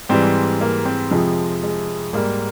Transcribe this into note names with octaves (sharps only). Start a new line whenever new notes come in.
G#2 E3 G3 C4
A#3
C4
F2 C3 F3 G#3
G#3
G#2 G3 A#3